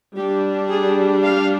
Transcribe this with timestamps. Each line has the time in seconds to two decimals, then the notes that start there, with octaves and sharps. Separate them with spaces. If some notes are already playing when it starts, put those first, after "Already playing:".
0.15 G3 D4 G4
0.69 G#4
1.23 F5